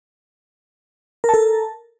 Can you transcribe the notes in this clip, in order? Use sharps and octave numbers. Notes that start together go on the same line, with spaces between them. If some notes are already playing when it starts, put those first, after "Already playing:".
A4 A#4 A5